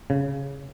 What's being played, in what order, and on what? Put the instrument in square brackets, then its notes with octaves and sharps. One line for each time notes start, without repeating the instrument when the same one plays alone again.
[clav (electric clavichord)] C#3